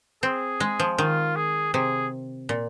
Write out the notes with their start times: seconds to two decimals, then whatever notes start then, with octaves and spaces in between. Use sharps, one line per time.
0.23 C4 G#4
0.60 G#3
0.80 F3
0.98 D#3 F4
1.36 G#4
1.73 C3 G#4
2.49 A#2